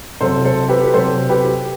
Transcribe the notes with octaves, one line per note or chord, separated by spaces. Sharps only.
C3 F#3 A4 C5
A4 C5
G4 B4
B4
C3 F#3 A4 C5
G4 B4